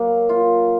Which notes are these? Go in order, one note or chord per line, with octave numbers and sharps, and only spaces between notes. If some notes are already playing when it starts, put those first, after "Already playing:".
Already playing: F#3 A#3
F4